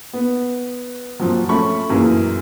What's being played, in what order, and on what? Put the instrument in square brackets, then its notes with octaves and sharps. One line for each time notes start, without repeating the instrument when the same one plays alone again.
[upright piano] B3
F2 A#2 F3 F#3
A3 C#4 B5 C#6
F#2 A#2 E3 A#3 G#4